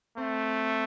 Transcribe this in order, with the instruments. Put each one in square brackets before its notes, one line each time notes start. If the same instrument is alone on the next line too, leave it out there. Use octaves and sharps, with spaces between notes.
[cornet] A3 [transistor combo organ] C4